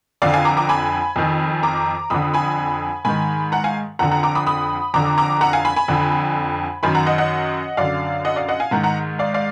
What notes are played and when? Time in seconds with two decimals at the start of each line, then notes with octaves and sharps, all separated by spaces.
0.22 F2 D3 D5 F5
0.33 F5 G#5
0.45 A#5 D6
0.57 A#5 D6
0.69 G#5 B5
1.16 F2 D#3
1.63 A#5 D6
2.10 F2 D3 B5 D#6
2.34 G#5 B5
3.05 G#2 D#3 G#5 B5
3.52 F#5 A#5
3.64 F5 G#5
3.99 F2 D3 F#5 A#5
4.11 F#5 A#5
4.23 A#5 D6
4.35 B5 D#6
4.47 B5 D#6
4.94 F2 D3 A#5 D6
5.18 A#5 D6
5.41 F#5 A#5
5.53 F5 G#5
5.65 G#5 B5
5.76 G#5 B5
5.88 F2 D3
6.83 F#2 D#3 G#5 B5
6.95 F#5 A#5
7.06 D#5 F#5
7.18 D#5 F#5
7.77 F#2 D3 D5 F5
8.25 D#5 F#5
8.36 D5 F5
8.48 D#5 F#5
8.60 F5 G#5
8.71 G#2 D#3 F#5 A#5
8.83 F#5 A#5
9.19 D5 F5
9.34 D5 F5